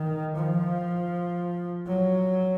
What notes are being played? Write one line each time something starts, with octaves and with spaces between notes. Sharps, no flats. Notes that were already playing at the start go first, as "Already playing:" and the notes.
Already playing: D#3
F3
F#3